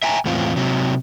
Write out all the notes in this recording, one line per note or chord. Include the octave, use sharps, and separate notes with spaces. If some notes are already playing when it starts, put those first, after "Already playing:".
E5 G5 G#5 A#5
E2 A2 C4 F4
C3 F#3